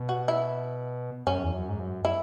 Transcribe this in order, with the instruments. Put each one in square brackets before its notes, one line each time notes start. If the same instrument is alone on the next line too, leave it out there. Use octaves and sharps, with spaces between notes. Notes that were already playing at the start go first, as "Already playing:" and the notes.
Already playing: [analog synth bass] B2
[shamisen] F#4
E4
[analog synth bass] F#2 [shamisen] C#4
[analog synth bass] E2
F#2
G#2
F#2
[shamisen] E4